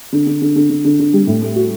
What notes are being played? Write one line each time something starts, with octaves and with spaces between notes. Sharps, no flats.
D3
D3
D3
D3
D3
D3
D3
G3
A2
A3
F#4